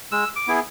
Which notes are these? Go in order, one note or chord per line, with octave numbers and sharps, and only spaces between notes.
G#3 E6
D6
B3 E4 G#4